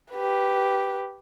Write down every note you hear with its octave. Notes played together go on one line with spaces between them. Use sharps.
G4 B4